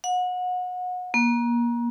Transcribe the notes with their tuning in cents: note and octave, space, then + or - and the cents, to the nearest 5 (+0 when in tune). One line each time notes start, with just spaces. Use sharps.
F#5 -30
A#3 +30